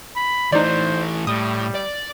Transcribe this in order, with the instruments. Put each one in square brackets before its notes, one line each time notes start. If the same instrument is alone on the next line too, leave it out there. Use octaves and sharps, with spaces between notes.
[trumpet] B5
[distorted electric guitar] E3 A3 [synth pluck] D#4 D5 [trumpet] C5
[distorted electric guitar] A2 [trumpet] G3 [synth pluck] D#6
[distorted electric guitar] D5